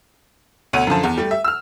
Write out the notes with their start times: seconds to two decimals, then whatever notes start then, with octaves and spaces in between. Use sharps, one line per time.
0.73 D2 B2 C#5 F#5 D#7
0.87 F#2 D3 F3 A5
1.03 E2
1.18 G3 A3
1.31 E5
1.44 E6 F6